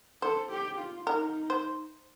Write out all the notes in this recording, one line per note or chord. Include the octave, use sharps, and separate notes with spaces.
A4 C5
G4
F4
D#4 A#4
C5